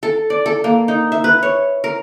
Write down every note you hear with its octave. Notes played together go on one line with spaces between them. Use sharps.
A4
D5
A4
A#3
D#4
E5
B4
C#5
A#4